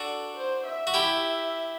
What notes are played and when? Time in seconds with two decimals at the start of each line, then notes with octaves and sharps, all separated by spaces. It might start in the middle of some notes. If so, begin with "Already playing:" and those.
Already playing: D4 F#4 A4
0.37 C5
0.66 E5
0.87 F#4
0.94 E4 G4